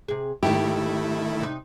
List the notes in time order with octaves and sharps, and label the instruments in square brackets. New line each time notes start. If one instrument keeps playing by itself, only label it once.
[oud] C3 G#4
[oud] G#2 E5 [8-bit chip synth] D#3 A3 E4 [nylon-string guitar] G4
[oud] C3 D#4